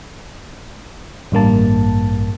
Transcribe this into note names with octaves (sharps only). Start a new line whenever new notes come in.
A1 G2 A#3 A5